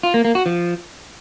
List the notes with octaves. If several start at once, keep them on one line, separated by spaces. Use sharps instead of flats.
F4
A#3
A#3
F#4
F3